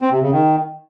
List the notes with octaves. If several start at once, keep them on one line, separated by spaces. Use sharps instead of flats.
C4
C3
C#3
D#3